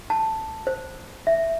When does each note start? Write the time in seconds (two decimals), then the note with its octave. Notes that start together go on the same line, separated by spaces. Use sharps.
0.10 A5
0.67 C5
1.27 E5